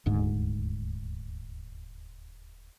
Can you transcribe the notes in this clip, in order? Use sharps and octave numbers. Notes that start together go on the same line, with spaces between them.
D#1 D2 G#2